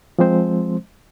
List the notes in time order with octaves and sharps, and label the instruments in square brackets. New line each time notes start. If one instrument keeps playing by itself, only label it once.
[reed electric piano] F3 G#3 C4 C5